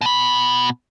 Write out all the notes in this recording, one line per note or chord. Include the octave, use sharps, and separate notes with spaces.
B2 B5